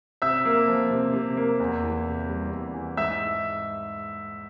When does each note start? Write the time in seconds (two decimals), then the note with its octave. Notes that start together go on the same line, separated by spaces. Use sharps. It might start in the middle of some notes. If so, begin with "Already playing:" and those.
0.22 C3 E5 E6
0.45 A#3
0.68 F3
0.91 C3
1.13 C3
1.37 A#3
1.60 E2
1.83 E3
2.06 C3
2.28 G3
2.51 E2
2.74 E3
2.97 G#2 E5 E6